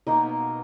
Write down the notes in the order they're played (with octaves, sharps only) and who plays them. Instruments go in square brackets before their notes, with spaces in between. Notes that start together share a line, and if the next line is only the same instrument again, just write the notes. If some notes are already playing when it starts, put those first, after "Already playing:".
[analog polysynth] B2 [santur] A#3 D#4 A#4 D#5